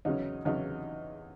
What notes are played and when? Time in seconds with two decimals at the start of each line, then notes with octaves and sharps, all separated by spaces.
0.05 E2 C#3 F#3 C#4 D#4
0.45 E2 C#3 F#3 C#4 D#4